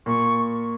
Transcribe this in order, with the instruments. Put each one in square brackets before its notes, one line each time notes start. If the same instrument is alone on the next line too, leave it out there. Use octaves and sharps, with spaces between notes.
[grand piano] A#2 [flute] C#6